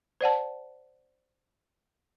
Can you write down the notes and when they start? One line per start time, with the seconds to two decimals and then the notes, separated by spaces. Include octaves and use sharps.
0.21 C5 D5 F#5 A5